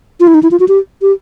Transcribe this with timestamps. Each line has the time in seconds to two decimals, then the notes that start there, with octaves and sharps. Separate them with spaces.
0.20 F4
0.27 E4
0.34 D#4
0.43 E4
0.51 F4
0.60 F#4
0.68 G4
1.02 G4